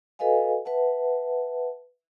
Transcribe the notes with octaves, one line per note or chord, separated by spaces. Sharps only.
F#4 A4 B4 D#5 F5 G#5
B4 E5 F#5 A5